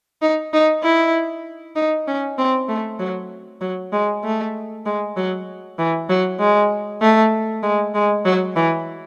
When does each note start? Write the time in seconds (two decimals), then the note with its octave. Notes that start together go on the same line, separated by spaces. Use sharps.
0.22 D#4
0.53 D#4
0.83 E4
1.76 D#4
2.08 C#4
2.38 C4
2.69 A3
2.99 F#3
3.61 F#3
3.93 G#3
4.24 A3
4.86 G#3
5.17 F#3
5.78 E3
6.09 F#3
6.40 G#3
7.01 A3
7.63 G#3
7.94 G#3
8.25 F#3
8.56 E3